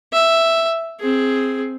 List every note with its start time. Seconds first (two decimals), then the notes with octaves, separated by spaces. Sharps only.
0.13 E5
1.00 C4 G#4